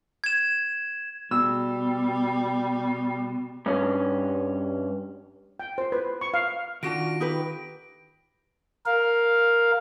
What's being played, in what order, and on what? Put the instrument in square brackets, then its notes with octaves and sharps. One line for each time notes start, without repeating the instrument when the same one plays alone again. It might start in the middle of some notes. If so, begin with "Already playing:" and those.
[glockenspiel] G#6 E7
[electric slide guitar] B2 [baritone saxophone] G3 [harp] E6
[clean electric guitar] G2 C#4
[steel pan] G5
C5
B4
C#6
F5
[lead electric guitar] D#3 F4 [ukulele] D4 F#4 F#5 [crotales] A#6 D7
[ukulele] D#4 G4 B4
[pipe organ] A#4 F5